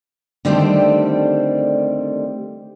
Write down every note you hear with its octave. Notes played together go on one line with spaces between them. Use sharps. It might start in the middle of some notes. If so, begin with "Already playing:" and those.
D3 D#3 G3 A3 C4 G4